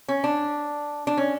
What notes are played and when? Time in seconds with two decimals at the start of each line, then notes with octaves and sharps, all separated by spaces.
0.08 C#4
0.24 D4
1.07 D4
1.17 C#4